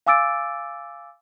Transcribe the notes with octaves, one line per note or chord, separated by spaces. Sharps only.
F5 G#5 D6 E6 A6 D7